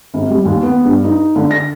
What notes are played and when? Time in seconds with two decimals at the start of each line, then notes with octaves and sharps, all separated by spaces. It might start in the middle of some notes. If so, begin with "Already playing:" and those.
0.14 G#1
0.30 G3
0.45 D#2
0.63 B3
0.84 G2
1.04 D#4
1.36 D3
1.51 A#6